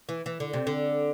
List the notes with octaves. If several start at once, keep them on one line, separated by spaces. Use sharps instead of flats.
E3
E3
D3
C3
D3